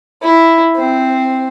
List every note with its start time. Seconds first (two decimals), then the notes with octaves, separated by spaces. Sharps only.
0.23 E4
0.76 C4